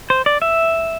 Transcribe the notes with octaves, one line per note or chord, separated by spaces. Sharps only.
C5
D5
E5